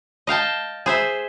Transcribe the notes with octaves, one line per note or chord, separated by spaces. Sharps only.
D#5 F5 G5 A5
G#4 C5 E5